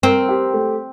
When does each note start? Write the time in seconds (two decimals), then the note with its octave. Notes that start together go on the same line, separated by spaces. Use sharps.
0.03 C4 A#4
0.29 G4
0.53 A3